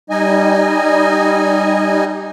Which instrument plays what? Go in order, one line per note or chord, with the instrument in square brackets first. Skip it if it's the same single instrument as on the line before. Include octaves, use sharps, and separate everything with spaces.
[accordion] G3 D#4 D#5 G#5